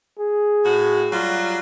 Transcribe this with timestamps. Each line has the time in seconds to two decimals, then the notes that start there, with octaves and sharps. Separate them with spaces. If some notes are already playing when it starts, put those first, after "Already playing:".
0.20 G#4
0.65 A2 F#4
1.13 F#3 G3 F4